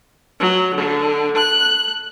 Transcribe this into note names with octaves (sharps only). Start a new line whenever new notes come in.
F#3
D3
F#6